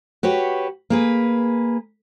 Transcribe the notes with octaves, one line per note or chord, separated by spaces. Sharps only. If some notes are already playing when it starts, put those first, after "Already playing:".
F#4 G4 B4 C#5
A#3 G#4 B4